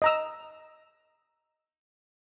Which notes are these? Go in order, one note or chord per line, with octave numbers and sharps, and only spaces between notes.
D#5 A#5 E6